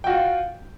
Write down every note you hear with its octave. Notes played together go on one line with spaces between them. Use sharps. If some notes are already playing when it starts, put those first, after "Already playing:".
F4 F#4 G5